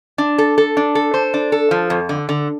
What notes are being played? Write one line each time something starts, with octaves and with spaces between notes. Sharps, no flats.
D4
A4
A4
D4
A4
C5
D4
A4
F3
F2
D3
D3